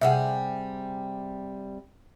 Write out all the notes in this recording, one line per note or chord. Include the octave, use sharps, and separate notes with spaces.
C3 G3 G#4 E5 F#5